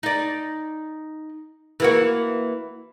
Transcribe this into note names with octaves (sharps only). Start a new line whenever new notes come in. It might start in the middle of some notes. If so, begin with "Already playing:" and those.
D#4 D5
E3 A#3 F#4